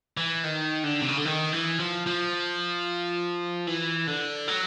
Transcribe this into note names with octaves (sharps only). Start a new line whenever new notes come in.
E3
D#3
D3
C3
C#3
D3
D#3
E3
F3
F3
E3
D3
F#3